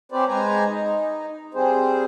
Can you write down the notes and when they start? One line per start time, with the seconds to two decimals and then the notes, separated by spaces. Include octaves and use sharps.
0.12 C4 C#4 G4 B4 C5 D5
0.28 G#3 B4 C5 G#5 A#5
0.65 D#4
1.54 G3 C4 G#4 C5